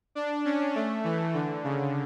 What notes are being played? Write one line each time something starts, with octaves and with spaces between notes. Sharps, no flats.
D4
C#4
A3
E3
D3
C#3